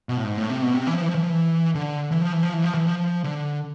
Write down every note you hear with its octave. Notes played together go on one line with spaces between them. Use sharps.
B2
A2
G#2
A2
C3
B2
C3
E3
F3
E3
F3
E3
F3
E3
D3
E3
F3
E3
F3
E3
F3
E3
F3
D3